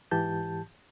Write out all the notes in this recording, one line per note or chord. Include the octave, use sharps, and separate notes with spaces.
G#2 E3 G4 A5 G6